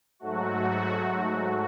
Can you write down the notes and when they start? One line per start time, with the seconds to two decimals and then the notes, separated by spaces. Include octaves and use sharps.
0.19 G#2 F#3 A3 F#4